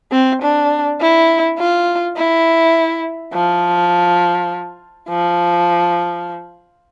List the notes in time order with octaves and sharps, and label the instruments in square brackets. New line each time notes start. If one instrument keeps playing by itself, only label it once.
[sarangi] C4
D4
E4
F4
E4
F3
F3